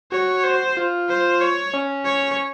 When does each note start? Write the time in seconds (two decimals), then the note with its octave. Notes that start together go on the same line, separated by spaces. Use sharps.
0.12 F#4 C#5
0.44 C5
0.77 F4
1.09 C5
1.41 C#5
1.74 C#4
2.05 C#5